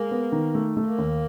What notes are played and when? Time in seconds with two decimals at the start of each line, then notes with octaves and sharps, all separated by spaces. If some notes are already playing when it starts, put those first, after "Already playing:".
Already playing: G#3 A#3
0.11 B3
0.32 D#3
0.55 A3
0.77 A3
0.87 A#3
0.98 D#2